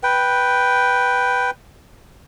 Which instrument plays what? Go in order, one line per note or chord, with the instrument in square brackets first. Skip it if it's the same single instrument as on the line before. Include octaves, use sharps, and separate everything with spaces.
[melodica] B4 G5